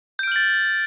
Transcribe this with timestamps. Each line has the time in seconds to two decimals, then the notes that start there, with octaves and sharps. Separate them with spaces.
0.19 G6
0.23 D7
0.27 F6
0.32 F#7
0.36 A6